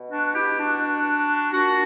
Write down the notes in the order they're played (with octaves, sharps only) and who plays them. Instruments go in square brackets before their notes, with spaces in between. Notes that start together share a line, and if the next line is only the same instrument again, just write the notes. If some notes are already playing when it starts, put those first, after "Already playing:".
Already playing: [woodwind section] B2
D4 F#4
E4 G4
D4 F#4
A#2 D4 F#4